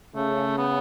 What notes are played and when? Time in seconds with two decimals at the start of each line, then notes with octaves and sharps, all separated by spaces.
0.15 C#3 A3
0.58 B3